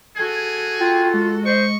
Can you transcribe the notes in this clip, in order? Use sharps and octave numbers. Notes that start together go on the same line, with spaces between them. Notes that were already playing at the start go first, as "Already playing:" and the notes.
F#4 G#4 A4 G#6
F4 G5
G#3
C5 D#5 C#6